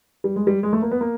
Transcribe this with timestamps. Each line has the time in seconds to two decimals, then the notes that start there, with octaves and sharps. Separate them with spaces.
0.24 G3
0.36 G#3
0.47 G3
0.63 G#3
0.73 A3
0.82 A#3
0.91 B3
1.01 A#3